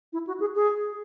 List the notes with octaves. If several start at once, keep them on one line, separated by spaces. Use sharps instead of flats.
E4
F#4
G#4
G#4